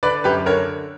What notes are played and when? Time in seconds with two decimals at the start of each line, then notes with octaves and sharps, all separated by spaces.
0.03 D3 B4 D5
0.24 F#2 G4 B4
0.46 D3 A#4 C#5